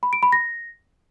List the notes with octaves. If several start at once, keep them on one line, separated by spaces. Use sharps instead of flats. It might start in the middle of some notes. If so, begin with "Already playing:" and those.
B5
D7
B5
A#6